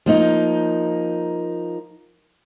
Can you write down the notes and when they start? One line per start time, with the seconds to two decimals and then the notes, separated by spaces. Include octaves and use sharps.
0.06 F3 A#3 D#4